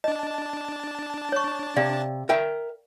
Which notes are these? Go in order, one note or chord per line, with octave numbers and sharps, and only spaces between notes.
D4 D#5 A5
C#5 C#6
C3 D5 F5
A#4 E5 G5